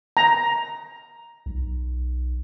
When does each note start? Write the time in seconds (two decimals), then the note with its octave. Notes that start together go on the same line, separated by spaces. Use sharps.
0.17 A#5
1.46 B1